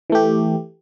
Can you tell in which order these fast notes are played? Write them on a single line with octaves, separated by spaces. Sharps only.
E3 A3 G4